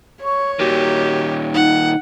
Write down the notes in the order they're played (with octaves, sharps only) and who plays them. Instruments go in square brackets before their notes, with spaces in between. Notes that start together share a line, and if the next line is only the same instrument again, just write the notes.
[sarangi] C#5 [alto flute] C#6
[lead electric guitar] A#2 D#3 [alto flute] F#4 [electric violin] G4
[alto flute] D#4 [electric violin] F#5